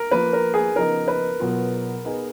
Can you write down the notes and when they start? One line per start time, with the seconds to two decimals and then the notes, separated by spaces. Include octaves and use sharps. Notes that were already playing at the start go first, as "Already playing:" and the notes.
Already playing: A#4
0.11 F3 A#3 F4 B4
0.33 A#4
0.54 G#4
0.76 C#3 F3 B3 D#4 A#4
1.08 B4
1.40 B2 F#3 B3 F4
2.05 B3 D#4 G#4 D#5